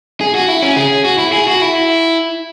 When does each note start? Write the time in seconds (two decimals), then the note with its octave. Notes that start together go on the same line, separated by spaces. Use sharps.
0.21 G#4
0.35 F#4
0.48 E4
0.62 C#4
0.76 G#4
1.05 F#4
1.18 E4
1.33 G#4
1.47 F#4
1.62 E4